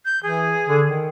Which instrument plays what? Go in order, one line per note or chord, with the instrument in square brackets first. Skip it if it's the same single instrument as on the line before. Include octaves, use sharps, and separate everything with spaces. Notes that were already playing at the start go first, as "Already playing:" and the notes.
[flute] G6
[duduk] E3 [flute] G#4
[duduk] D3
D#3